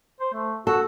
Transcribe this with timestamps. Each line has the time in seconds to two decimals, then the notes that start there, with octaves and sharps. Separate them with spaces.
0.20 C5
0.33 A3
0.67 F#4 A4